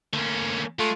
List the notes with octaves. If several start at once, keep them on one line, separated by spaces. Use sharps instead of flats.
D3 A3 A#3 C#4
G#3 A3 F4